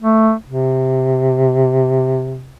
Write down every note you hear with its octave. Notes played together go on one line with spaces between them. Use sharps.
A3
C3